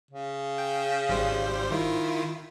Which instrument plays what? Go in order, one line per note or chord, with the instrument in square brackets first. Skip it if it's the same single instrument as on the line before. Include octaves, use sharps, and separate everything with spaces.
[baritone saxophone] C#3
[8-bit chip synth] G5
G#1 G3 C5
D#3 E4 F4